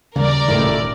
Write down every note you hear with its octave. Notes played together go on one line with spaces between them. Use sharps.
D#2 C#3 G3 A#4 D5
D#1 A2 D#3 E4